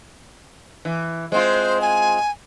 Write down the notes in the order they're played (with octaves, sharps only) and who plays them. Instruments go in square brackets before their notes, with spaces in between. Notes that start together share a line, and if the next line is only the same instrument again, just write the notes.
[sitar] E3
[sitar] G#3 C4 F4 [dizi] C5
[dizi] G#5